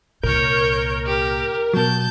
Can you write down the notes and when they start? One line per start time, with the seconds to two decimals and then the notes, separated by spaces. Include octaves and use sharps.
0.23 C2 A#2 A#4 C#5 G6
1.06 G4
1.74 B2 F#3 A5 G6